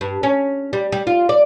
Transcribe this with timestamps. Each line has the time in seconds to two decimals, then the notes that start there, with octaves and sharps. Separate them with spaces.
0.01 G2
0.23 C#4
0.73 G3
0.92 G3
1.07 F4
1.29 D5